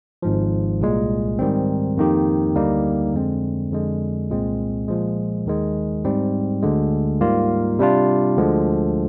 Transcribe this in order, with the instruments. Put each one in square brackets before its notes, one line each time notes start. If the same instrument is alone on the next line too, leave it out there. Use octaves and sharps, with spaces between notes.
[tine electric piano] G#1 G#2 F3
C2 A#2 G#3
G#2 D#3 G3 C4
F2 D#3 A#3 D#4 G4
D2 D3 G3 A#3 D#4
F2 D3 G#3 C4
F2 D3 G#3
C2 A#2 G#3 C4
A#2 F3 G#3
D#2 D#3 G#3
G#2 G3 C4
D2 D3 G#3
G#2 G3 A#3 F4
C3 G3 D4 F4
D2 D3 F3 G#3